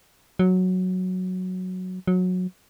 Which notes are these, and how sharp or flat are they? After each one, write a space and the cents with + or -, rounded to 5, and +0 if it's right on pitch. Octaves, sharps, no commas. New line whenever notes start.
F#3 -5
F#3 -20